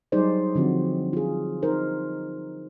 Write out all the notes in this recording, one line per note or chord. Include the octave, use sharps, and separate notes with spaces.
F#3 G3 D#4 G#4 C5 D5
D3 F3 C4 F#4
F4 G#4
D#4 A#4 C5